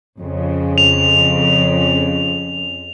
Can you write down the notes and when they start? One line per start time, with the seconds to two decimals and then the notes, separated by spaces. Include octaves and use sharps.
0.18 F2 C#3
0.78 F7